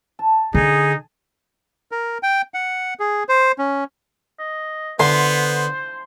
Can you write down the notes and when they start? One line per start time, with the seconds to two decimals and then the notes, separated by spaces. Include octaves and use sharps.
0.19 A5
0.54 D3 D#4 G#4
1.92 A#4
2.23 G5
2.54 F#5
3.00 G#4
3.29 C5
3.58 C#4
4.39 D#5
5.00 D3 B3 C5 C6